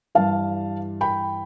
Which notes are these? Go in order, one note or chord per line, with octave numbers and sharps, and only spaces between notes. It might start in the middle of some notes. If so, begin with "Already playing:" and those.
G2 E3 G3 F5 A5
G5 B5